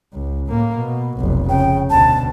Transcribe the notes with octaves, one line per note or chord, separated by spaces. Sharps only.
C#2
A2 A#3
B2
F1 B1
C#3 G5
D2 B2 A5